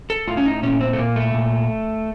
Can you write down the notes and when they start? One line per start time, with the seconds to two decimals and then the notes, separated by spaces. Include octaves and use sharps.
0.10 A4
0.28 A2 F4
0.37 C#4
0.46 D#4
0.63 A#2 C#4
0.81 C4
0.93 A3
0.98 A#2 A#3
1.16 A3
1.34 A#2